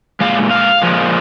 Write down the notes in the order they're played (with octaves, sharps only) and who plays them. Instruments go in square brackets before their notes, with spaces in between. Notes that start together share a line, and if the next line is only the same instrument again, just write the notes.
[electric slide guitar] A#2 G#3 F5
F5
A#2 F3 G#3